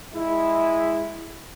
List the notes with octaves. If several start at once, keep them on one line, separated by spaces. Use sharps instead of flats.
G#3 E4